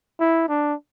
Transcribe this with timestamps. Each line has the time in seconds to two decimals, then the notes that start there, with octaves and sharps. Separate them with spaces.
0.20 E4
0.48 D4